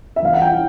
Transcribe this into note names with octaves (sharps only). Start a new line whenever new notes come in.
E5
E2 F5
F#5
G5
E3